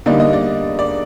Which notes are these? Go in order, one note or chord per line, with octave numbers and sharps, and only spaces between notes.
D3 G3 A#3 D#4 D5
D#5
D5
D5